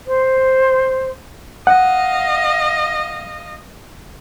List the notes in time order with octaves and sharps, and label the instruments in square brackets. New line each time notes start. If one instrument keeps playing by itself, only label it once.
[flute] C5
[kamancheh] D#5 F5 [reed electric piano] F#5